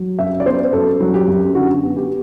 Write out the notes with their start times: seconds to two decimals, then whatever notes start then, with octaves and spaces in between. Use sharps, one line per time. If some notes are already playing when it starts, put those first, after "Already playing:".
Already playing: F#3
0.19 F#2 E5
0.40 D5
0.46 B3 C5
0.73 F#2 A4
1.00 F#3
1.14 G4
1.28 F#2
1.55 D3 F#4
1.83 B3
1.96 G4